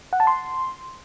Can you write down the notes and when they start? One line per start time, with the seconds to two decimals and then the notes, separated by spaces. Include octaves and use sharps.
0.13 F#5
0.20 A5
0.27 C6